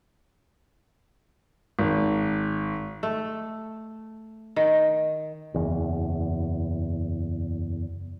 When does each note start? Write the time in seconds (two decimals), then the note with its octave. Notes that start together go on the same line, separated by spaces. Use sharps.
1.79 G#1
3.03 A3
4.56 D#3
5.54 F#1 E2